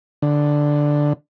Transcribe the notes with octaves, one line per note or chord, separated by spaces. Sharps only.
D3